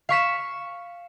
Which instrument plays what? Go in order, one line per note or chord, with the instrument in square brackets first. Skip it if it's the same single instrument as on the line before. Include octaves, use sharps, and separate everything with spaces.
[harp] F5 C#6 B6 E7